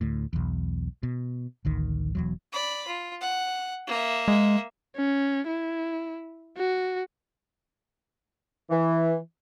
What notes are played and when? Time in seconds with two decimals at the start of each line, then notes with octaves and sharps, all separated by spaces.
0.01 D2 A2
0.33 B1 E2
1.03 B2
1.65 A1 D2 D#3
2.15 E1 E2 F#3
2.52 D5 B5
2.87 F4
3.21 F#5
3.87 A#3 E5
4.28 G#3
4.96 C#4
5.47 E4
6.58 F#4
8.70 E3